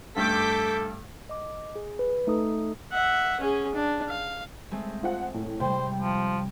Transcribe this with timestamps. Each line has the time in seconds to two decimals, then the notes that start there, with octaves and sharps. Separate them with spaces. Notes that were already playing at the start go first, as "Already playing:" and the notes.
0.16 G2 A3 A4 D6 G6 B6
1.29 D#5 D6
1.76 G#4
1.99 B4
2.27 A3 D#4 A4 D#6
2.92 E5 F#5
3.40 C#4 G#4
3.75 D4
4.08 F5
4.71 G#3 A3 C4
5.03 F4 C5 F#5
5.34 A2
5.60 C3 G3 C5 G5
6.02 F3